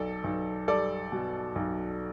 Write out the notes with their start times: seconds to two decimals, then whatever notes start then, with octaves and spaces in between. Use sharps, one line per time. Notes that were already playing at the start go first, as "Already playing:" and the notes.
Already playing: B1 A4 D5
0.24 B1
0.68 G3 A4 D5
1.12 B2
1.56 B1